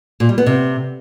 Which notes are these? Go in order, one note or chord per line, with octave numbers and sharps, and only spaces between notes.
A#2
G3
B3
C3